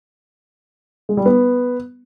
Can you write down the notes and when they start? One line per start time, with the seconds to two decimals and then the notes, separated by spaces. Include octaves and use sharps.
1.09 G#3
1.17 G3
1.26 B3